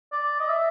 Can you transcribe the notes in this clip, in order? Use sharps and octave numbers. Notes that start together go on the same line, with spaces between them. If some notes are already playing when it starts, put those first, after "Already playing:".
D5
D#5
E5